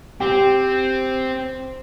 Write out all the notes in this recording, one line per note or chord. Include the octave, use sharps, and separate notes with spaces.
C4 G4